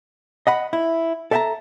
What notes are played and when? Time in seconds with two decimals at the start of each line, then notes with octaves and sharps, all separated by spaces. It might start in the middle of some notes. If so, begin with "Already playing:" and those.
0.47 D#5 F#5 B5
0.73 E4
1.31 A4 D5 E5 G5 A5 A#5